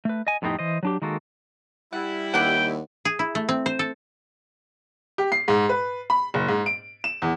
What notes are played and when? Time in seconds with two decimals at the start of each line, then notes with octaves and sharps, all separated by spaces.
0.05 A3 B4
0.27 D#5 G#5
0.42 F2 A2 B3 C4 D#4 G4
0.59 E3 C5 D#5
0.83 F#3 D4 G4
1.02 D#3 G#3 A#3 F#4 A4
1.93 G3 E4 F#5
2.34 D#2 B2 D4 F#5 G5
3.05 G#4
3.19 E4
3.35 A3
3.49 C4
3.66 C5
3.79 A4
5.18 G4
5.32 C7
5.48 G#2
5.69 B4
6.10 B5
6.34 F#1
6.48 G#2
6.66 D7
7.04 E7
7.22 E2